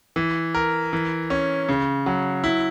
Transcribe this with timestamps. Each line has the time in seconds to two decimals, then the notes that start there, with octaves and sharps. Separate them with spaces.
0.16 E3
0.55 A#4
0.93 E3
1.30 C#4
1.69 C#3
2.06 F#3
2.44 E4